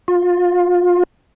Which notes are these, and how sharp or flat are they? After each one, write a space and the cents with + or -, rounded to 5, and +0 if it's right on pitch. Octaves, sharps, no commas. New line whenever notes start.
F4 +25